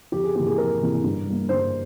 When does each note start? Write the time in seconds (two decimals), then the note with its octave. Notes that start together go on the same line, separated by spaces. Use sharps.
0.12 F2 G4
0.24 G#4
0.35 C3 E3 A#3 G4
0.46 G#4
0.57 F2 A#4
0.81 C3 E3 A#3
1.04 G2
1.26 G3 A#3
1.49 G2 C5